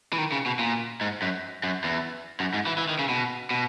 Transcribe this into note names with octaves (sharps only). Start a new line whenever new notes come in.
E3
D#3
C#3
B2
A#2
G#2
F#2
F#2
E2
F#2
G#2
E3
E3
D#3
C#3
B2
B2